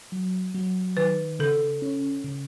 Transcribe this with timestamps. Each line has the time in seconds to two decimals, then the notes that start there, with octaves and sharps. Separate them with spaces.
0.12 F#3
0.54 F#3
0.97 D#3 B4
1.39 C#3 A4
1.82 C#4
2.24 C#3